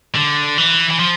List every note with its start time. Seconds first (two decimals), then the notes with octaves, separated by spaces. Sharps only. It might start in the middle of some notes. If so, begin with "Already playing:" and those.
0.15 D3
0.58 E3
0.90 E3
0.99 F3